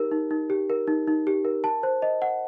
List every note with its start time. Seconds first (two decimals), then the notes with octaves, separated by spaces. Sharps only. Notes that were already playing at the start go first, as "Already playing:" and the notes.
Already playing: D#4 G4 A#4
0.11 D#4
0.31 D#4
0.50 G4
0.70 A#4
0.87 D#4
1.07 D#4
1.27 G4
1.45 A#4
1.64 A5
1.83 C5
2.02 D#5
2.22 F#5